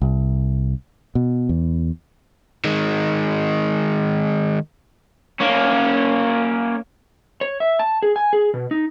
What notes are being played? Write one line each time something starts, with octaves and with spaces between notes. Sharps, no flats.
C2
B2
E2
D#3 G#3
A#3 C#4
C#5
E5
A5
G#4
G#5
G#4
B2
D#4